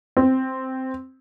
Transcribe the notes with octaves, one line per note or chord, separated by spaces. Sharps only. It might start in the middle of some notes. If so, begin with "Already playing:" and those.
C4